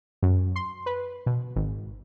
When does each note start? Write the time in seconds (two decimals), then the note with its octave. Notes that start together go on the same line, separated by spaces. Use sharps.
0.23 F#2
0.56 C6
0.86 B4
1.26 B2
1.56 G#1